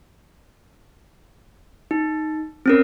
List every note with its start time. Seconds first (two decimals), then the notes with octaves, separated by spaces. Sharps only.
1.91 D#4
2.66 C4 C#4 A#4